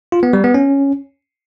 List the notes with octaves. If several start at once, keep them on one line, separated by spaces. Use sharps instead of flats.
F4
B3
G3
B3
C#4